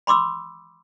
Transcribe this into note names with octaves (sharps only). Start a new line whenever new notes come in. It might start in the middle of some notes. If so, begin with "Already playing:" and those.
B5 C6 D6 E6